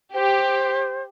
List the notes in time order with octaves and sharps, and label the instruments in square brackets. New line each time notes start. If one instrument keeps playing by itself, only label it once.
[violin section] G4 [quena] C5